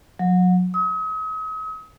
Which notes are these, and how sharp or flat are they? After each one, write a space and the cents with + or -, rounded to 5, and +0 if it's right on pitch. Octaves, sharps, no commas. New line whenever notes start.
F#3 -30
D#6 +40